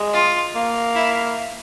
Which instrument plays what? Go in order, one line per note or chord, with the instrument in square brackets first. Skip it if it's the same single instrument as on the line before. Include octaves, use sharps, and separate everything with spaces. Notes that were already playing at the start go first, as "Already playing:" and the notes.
Already playing: [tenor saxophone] G#3
[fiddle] F4
[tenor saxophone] A#3
[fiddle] E4